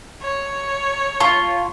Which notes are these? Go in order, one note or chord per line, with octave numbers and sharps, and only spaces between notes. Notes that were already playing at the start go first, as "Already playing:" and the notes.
C#5
F4 A5 C#6